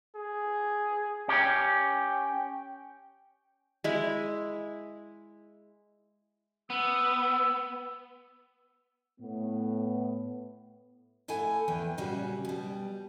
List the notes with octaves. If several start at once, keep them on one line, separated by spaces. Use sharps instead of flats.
G#4
C#4 G4 G5
G#3 E4
B3 E6
A2 B3
A3 E4 A4 F#5 G#5
E2 E3 G5
A#2 C#3 G3 C#4 F#4
B2 G3